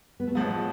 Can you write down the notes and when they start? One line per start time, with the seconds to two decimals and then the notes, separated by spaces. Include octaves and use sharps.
0.20 B3
0.27 A3
0.35 A1 A2 F3 G#3 B3